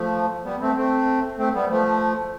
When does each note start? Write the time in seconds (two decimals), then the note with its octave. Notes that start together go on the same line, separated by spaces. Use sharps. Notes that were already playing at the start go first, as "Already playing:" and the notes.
Already playing: F3 A3
0.45 G3 B3
0.60 A3 C4
0.76 A3 C4
1.38 A3 C4
1.54 G3 B3
1.70 F3 A3